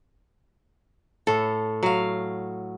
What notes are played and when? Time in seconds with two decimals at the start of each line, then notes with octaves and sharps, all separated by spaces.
1.27 A2 A4
1.83 F#3 F5